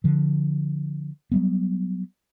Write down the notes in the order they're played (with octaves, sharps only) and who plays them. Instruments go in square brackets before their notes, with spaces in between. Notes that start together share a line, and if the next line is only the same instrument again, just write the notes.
[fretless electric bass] D3 F3
F#3 G3 B3